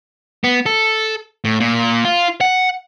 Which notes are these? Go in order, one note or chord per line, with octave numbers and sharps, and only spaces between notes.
B3
A4
A2
A#2
F4
F#5